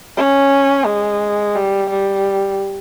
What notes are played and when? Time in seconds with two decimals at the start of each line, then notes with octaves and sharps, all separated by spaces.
0.17 C#4
0.86 G#3
1.55 G3
1.90 G3